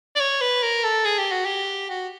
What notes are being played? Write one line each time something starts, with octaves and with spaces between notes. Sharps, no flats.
D5
C#5
B4
A#4
A4
G#4
G4
F#4
G4
F#4